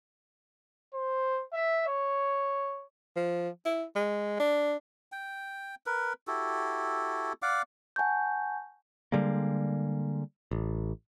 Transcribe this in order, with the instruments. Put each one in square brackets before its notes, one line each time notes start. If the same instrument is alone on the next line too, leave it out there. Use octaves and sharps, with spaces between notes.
[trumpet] C5
E5
C#5
[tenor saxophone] F3
E4
G#3
D4
[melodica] G5
A#4 B4
E4 F#4 G4 A4
D5 F5 F#5 D6
[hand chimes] F#5 G#5 A5 C#6 G6
[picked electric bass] D3 G3 G#3 A#3
A1